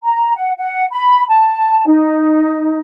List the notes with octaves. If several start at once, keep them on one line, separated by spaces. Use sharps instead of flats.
A#5
F#5
F#5
B5
A5
D#4